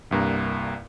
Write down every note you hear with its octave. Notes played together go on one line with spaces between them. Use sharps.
C2 G2 A#3 A#5